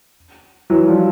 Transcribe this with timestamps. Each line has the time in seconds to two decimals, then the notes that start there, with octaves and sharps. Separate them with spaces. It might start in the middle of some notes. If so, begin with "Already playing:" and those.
0.70 E3 F#3
0.87 F3 G3